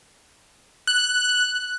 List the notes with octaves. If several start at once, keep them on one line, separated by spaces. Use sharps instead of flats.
F#6